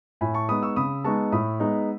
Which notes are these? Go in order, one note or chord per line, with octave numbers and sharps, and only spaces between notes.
A2 G#5 B5
A5 C#6
G#3 B3 D#4 B5 D#6
C#6 E6
C#3 B5 D#6
G#3 B3 D#4 A5 C#6
A2 B5 D#6
G#3 B3 D#4